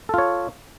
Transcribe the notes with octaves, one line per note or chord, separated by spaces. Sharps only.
F4 A4 C#5